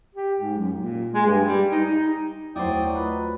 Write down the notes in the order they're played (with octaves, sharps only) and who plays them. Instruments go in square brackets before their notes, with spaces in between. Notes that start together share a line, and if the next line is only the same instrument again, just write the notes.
[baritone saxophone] G4
G#2
F#2
A#2
G#3
G2
G3
D#4
D#4
[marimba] D#2 A3 [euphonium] F#3 [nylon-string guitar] E4 C5 [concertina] D5 G5 D#6
[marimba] A3 F4 D#5 [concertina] B4